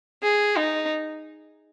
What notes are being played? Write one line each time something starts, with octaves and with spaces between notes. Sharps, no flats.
G#4
D#4